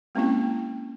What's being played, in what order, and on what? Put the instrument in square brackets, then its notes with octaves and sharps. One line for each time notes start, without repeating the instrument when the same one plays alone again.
[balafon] G#3 A#3 C4 C#4 E4 G5